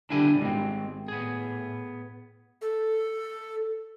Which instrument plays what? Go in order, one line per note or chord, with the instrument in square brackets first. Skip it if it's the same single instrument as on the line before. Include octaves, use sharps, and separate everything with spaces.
[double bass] D3 G3 [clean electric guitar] D4 E4 G#5
[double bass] G#1 [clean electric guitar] G#3 C4
[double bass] A2 [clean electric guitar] B3 G#4
[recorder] A4